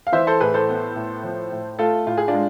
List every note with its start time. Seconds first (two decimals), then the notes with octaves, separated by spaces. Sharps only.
0.07 F5
0.12 E3 C5 E5
0.27 A4 C5
0.40 A2 G#4 B4
0.54 A4 C5
0.69 B3
0.96 A2
1.23 F3
1.52 A2
1.79 A3 F4 A4
2.06 A2 F4
2.18 G#4
2.28 D4 F4
2.34 G#3